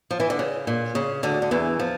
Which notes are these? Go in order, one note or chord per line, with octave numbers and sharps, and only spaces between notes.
F3
E3
D3
C#3
A#2
C#3
D2 D3
D3
E2 E3
F3